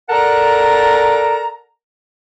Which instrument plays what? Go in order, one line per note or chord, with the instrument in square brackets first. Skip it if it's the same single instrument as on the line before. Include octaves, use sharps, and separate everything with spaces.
[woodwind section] A4 A#4 D5 F#5 A5 A#5